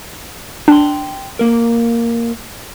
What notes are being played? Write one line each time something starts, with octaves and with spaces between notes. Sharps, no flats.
D4 G5 A5 C6
A#3 A#4